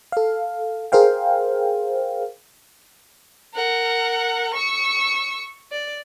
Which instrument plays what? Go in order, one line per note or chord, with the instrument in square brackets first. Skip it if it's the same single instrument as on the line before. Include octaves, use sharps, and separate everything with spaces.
[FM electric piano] A4 F5
G#4 A#4 C5 F5 G5
[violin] A#4 F#5
C#6 E6
D5